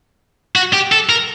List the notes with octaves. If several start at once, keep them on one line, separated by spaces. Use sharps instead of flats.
F#4
G4
A4
A#4